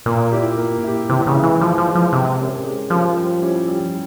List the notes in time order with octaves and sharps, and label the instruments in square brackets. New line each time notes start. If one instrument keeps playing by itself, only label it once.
[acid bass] A#2 [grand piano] A#3
[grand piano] E4 G4
A#3
E4 G4
[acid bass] C3 [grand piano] E3
[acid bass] C#3
[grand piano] G#3 E4
[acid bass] E3
[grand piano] E3 [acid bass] F3
[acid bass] F3
[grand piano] G#3 E4
[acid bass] F3
[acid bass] C3 [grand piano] G#3
[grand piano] C#4 G4 A#4
G#3
[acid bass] F3 [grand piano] C#4 G4 A#4
[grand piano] G3
C#4 E4 G4
G3